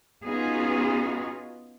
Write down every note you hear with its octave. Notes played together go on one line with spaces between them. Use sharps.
B3 C#4 D#4 F4 F#4 G#4